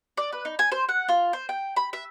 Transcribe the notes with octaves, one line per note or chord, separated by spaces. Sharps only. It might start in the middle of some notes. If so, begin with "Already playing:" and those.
D5
B4
D#4
G#5
C5
F#5
F4
C5
G5
B5
E5